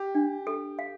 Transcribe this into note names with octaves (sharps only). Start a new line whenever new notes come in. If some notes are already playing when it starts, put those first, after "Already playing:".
Already playing: G4
D4
A4
F5